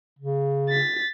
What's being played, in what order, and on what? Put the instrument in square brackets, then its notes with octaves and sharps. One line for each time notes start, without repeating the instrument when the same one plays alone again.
[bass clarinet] C#3
[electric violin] A6 B6